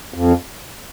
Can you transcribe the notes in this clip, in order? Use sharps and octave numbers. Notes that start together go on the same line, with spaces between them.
F2